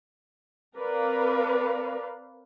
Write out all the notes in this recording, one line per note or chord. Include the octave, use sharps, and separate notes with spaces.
C4 A#4 B4 D5 F5